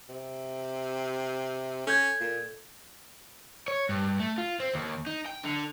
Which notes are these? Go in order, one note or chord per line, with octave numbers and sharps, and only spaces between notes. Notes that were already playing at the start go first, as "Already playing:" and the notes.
C3
C#4 A4 G6 G#6
A#2
C#5
G2
A3
F4
C4
D#2
D#4
G5
D3